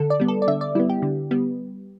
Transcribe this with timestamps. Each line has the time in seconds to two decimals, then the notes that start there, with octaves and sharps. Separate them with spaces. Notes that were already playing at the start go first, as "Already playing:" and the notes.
Already playing: D3 A4
0.10 D5
0.20 G3 B3
0.28 A4
0.42 D5
0.48 D3 E5
0.61 D5
0.75 G3 B3 E4
0.89 G4
1.02 D3
1.31 G3 B3